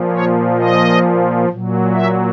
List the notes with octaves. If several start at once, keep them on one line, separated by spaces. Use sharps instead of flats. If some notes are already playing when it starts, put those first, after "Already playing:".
Already playing: A#2 F3
C#5
D#5
A#2 F#3
E5